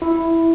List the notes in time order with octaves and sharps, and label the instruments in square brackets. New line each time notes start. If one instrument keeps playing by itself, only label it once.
[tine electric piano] E4